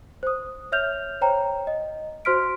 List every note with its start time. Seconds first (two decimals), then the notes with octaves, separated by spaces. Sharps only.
0.23 C5 D#6
0.72 C#5 E5 F6 G6 F7
1.21 C5 C#5 G5 A#5
1.67 D#5
2.25 F#4 C5 C6 F6 B6 D7